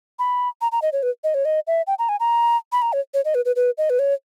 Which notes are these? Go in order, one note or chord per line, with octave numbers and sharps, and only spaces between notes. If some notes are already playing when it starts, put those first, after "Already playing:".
B5
A#5
A#5
D#5
C#5
B4
D#5
C#5
D#5
E5
G5
A#5
G#5
A#5
B5
A#5
C#5
C#5
D#5
B4
B4
B4
D#5
B4
C#5